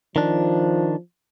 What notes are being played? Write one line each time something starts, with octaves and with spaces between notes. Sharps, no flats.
D#3 F3 D4